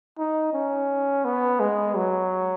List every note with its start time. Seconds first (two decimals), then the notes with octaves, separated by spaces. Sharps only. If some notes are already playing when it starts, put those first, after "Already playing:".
0.18 D#4
0.53 C#4
1.25 B3
1.60 G#3
1.96 F#3